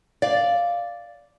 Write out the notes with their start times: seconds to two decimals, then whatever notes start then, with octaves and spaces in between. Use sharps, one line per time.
0.22 D5 F5